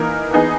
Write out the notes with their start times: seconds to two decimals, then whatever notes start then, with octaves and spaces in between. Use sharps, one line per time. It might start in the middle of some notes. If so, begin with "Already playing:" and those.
Already playing: E3 A#3 D#4 A#4
0.31 E3 B3 D#4 G#4